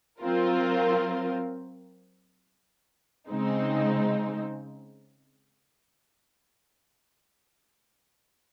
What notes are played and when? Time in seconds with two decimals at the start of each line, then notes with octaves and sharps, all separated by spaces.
0.20 F#3 C4 F4 A#4
3.30 C#3 G#3 C4 D#4